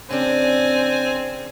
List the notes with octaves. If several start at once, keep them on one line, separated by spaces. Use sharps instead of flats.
C#3 C4 D4 G#5